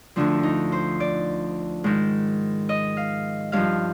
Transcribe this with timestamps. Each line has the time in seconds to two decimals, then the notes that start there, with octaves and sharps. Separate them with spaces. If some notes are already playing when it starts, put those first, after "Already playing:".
0.16 D2 D3 F3 D4
0.43 D#4
0.72 C5
1.00 D5
1.84 G#2 D#3
2.69 D#5
2.97 F5
3.52 G2 F3 F5